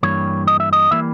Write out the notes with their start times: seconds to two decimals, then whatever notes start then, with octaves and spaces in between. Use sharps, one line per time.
0.03 G2 E3 G3 A#3 C#5
0.47 D#5
0.60 E5
0.73 D#5
0.91 E3 G3 A#3 E5